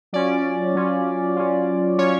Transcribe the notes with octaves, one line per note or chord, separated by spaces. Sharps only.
F#3 C#4 F4 D5
F#3 C#4 F4
F#3 C#4 F4
F#3 C#4 F4 C#5